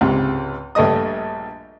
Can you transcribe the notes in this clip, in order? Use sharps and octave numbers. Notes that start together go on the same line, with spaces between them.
C#2 G#2 C3
A#1 G2 A3 D#5 D#6